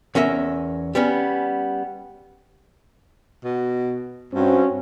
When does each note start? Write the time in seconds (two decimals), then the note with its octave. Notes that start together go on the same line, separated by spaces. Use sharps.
0.15 E2 C#4 A#4 E5
0.95 G3 B3 C#4
3.44 B2
4.33 G2 C4 C#4 F#4